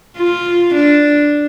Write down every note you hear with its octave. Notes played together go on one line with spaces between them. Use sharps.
F4
D4